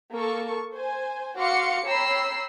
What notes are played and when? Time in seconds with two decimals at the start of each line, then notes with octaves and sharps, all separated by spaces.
0.12 A#3 A4 C#6
0.72 C5 G#5
1.37 F#4 F5 F#5 C6 D6 C#7
1.86 C#5 G5 A#5 B5 E6 C7